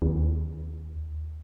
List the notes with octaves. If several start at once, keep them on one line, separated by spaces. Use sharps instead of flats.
D#2